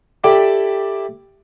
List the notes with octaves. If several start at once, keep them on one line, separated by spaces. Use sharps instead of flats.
E4 G4 A4 D5 G5